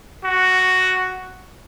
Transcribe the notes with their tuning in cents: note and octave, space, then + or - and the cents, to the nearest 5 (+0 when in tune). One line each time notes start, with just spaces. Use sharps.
F#4 +5